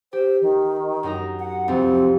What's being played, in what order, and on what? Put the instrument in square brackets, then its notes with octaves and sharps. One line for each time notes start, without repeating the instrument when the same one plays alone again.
[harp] G4 [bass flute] C5
[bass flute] D#3
[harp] F#2 D#4 A#5
[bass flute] F#5
[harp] C2 F2 [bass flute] C4